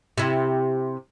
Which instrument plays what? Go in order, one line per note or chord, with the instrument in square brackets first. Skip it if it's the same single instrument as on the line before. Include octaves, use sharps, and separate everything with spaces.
[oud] C3 E4